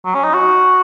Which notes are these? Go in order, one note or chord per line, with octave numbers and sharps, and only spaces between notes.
F#3
C#4
D#4
F#4